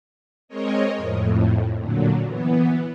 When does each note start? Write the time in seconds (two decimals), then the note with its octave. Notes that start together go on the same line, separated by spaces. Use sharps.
0.48 G#3 C4 A#4 C#5 D#5
0.96 F2 A2
1.78 A#2 D3 F#3
2.24 E3 B3